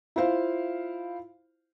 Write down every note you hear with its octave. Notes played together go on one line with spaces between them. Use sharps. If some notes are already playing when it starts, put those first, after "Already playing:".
E4 F4 C5 F5